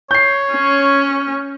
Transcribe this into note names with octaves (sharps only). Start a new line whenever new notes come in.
C#5 G6 C7
C#4